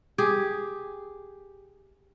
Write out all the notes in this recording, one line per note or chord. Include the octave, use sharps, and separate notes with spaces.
G4 G#4